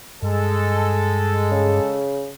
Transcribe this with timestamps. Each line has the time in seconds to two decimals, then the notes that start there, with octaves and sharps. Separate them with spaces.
0.22 G2 G#3 A4
1.51 C#3